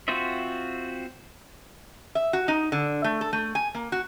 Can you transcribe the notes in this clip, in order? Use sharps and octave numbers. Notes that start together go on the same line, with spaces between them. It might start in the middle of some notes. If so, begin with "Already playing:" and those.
C4 F4 F#4 C5 E5
E5
F#4
D#4
D3
A3
A4
A3
G#5
A#3
F#4